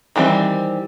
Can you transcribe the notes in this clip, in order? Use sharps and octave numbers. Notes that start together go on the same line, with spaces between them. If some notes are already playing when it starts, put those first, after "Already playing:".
D#3 E3 G3 C4